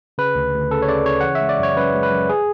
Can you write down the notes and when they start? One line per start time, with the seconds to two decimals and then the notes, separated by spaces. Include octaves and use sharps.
0.18 C#3 B4
0.35 D2
0.54 D2
0.71 C#3 A4
0.82 C#5
0.88 C#3 D5
1.06 C#3 C#5
1.21 E3 F#5
1.35 E5
1.41 G#3
1.49 D5
1.59 F#2 C#5
1.77 F#2 B4
1.95 G#3
2.03 B4
2.11 F#2
2.29 G#4